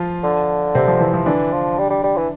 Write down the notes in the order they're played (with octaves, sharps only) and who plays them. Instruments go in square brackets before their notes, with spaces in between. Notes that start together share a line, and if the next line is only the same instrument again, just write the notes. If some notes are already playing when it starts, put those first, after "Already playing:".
Already playing: [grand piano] F3 F4
[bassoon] D3
[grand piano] C3 C4
F3
E3
F3
[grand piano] D3 D4 [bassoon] E3
[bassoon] F3
G3
G3
G3
E3